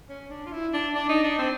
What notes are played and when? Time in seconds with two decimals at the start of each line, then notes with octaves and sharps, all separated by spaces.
0.09 C#4
0.30 D4
0.46 F4
0.52 E4
0.73 D4
0.95 D4
1.09 D#4
1.24 D4
1.38 C4